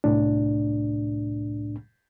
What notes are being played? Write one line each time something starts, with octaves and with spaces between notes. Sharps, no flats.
C2 A2 D4